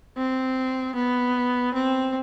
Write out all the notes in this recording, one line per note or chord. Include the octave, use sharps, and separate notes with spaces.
C4
B3
C4